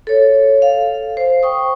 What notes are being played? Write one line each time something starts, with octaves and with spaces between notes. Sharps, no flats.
A4 C#5
F5
C5
G5 C#6 D#6